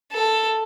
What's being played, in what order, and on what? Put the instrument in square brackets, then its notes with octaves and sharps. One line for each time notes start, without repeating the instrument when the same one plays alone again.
[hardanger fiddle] A4